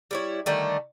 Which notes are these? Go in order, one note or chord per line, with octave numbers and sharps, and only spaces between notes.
G3 E4 C#5
D3 D#3 G3 A3